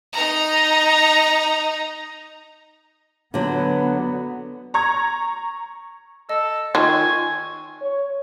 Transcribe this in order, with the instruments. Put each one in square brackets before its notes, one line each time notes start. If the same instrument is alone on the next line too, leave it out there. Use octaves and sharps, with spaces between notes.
[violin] D#4 A#5
[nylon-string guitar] D3 F#3 [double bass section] B3
[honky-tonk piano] A#5 C#6 G#6
[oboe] A4 [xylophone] D#5
[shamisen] D#3 [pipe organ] F4 C#6 [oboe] G#5
[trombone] C#5